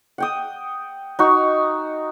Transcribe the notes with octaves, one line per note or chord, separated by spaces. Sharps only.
F#5 G5 D#6
D#4 F#4 C#6